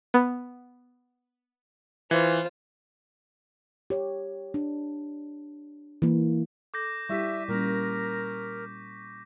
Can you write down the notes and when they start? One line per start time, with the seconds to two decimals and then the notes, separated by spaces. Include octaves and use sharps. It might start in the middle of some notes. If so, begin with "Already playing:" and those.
0.14 B3
2.11 E3 F4 C5
3.90 G4 C#5
4.54 D4
6.02 E3 A#3
6.74 A4 D6 G6 A#6
7.09 G3 E4 G4 E5 C#6 B6
7.48 A#2 G3 A#3 C#4 A#4